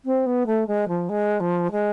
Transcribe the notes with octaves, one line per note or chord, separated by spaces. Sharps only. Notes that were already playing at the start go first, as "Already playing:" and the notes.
C4
B3
A3
G#3
F3
G#3
F3
G#3